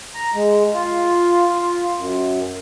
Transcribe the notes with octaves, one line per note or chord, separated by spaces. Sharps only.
A#5
G#3
F4
F4
F#2